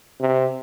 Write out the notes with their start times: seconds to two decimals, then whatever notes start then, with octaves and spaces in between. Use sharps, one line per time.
0.20 C3